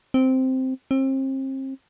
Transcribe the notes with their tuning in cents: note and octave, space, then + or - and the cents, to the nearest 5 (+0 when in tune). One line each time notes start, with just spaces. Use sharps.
C4 -5
C4 +35